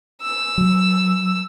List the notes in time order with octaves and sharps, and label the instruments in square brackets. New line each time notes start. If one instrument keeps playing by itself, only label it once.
[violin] E6
[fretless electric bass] F#3